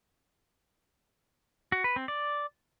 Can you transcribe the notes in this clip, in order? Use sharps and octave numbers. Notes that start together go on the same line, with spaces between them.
F#4
B4
C4
D5